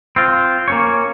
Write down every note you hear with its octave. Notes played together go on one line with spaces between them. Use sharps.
C4 F4
A#3 C#4 C#5